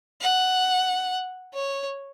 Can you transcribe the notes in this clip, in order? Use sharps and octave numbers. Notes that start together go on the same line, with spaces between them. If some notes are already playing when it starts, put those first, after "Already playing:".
F#5
C#5